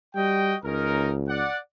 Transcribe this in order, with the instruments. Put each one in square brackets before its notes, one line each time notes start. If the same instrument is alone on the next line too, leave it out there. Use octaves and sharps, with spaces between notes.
[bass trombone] G3 [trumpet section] F#4 D#5 G5
[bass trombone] C#2 [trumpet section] C#4 D#4 A#4
[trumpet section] D5 F#5